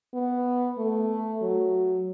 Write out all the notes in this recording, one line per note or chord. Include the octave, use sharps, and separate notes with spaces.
B3
A3
F#3